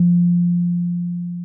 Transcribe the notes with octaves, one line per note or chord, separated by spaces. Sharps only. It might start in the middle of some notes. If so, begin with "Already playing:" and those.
Already playing: F3